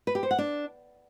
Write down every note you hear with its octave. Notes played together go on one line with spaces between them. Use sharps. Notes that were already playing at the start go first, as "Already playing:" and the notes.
B4
G4
C5
F#5
D4